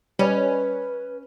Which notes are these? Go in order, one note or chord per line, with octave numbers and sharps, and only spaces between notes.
G3 C#4 B4 D#5